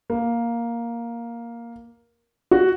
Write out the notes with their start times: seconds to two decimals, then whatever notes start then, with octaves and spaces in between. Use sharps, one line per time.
0.10 A#3
2.51 F#4